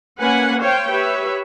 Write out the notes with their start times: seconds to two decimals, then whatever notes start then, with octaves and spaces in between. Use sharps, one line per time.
0.19 A#3 C#4 B4 F#5 G#5
0.60 C5 C#5 F5 G5
0.89 G4 B4 C#5 E5